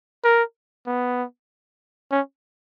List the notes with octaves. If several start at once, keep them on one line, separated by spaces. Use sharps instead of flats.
A#4
B3
C#4